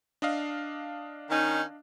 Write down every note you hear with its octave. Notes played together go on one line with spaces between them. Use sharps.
D4 D#5 F5
D#3 C#4 D#4